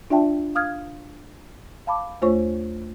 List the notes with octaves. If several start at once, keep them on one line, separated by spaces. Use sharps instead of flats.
D4 F4 D5 E5 G5 A5
F5 D#6 F6 G#6
F5 A5 B5 D6
D#2 A3 F4 C5 C#5 C#6